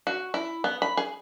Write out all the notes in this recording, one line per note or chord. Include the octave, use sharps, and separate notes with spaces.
F#4
E4
B3
B5
G#4